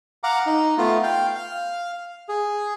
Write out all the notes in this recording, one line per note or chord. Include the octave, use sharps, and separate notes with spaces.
F5 F#5 A#5 D6
D#4
A3 B3 F4
F5 G5
F5
G#4